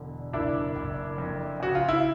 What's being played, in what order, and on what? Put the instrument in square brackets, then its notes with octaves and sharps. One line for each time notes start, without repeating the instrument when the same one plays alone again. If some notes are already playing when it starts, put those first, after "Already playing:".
Already playing: [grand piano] E1 D3
F#1 D4 E4
F#1
F2
C#3 F#4
F4
E4